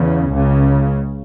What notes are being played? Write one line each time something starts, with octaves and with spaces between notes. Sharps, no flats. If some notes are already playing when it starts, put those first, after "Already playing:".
Already playing: E2 C#3
C#2 C#3